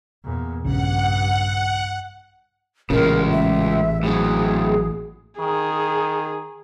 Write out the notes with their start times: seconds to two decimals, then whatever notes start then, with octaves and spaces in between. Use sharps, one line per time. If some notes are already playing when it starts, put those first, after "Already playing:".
0.24 E2 A#2
0.64 A#1 G2 C#3 F#5
2.90 A1 A#2 C#3 G#3 A#4
3.31 E5
4.03 A2 F#3 G#4
5.39 D#3 G#4